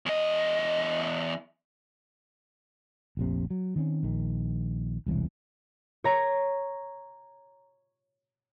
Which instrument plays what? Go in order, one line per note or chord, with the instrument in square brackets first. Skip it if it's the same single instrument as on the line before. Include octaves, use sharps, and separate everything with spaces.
[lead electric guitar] E2 D#5
[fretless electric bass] F1 A#1 C3
F#3
D#3 C4 C#4
A#1 D#3
E1 C2 D3 E3
[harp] C#5 A#5